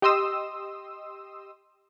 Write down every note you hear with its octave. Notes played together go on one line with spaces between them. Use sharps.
G4 D#5 C6 D#6 E6